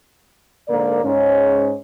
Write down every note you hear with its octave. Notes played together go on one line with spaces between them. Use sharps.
G#2 D3 A#3 A#4 D5
G#2 C#4